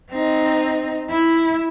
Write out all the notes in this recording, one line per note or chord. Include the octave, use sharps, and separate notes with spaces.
C4 D#4
E4